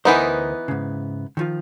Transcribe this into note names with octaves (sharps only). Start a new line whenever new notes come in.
D2 E3 B3 D#4 A#4 C5
G#2 C#3
D#3 F3 F4